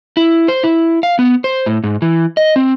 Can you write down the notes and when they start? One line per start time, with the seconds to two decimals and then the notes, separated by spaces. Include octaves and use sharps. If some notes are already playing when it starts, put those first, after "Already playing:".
0.17 E4
0.48 C5
0.64 E4
1.03 F5
1.19 B3
1.44 C5
1.66 A2
1.84 G#2
2.02 E3
2.37 D#5
2.56 C4